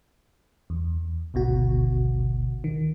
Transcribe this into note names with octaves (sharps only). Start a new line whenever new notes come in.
E2
G#1 D2 B2 F#4
D#3